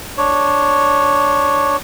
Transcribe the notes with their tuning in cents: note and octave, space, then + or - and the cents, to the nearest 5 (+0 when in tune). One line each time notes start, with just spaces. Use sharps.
D4 +0 C#5 +0